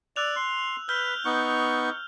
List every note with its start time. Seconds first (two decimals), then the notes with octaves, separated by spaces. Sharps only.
0.16 D5 E6 F#6 F7
0.36 C6
0.89 B4 F6 G6 G7
1.25 B3 D#4 C#6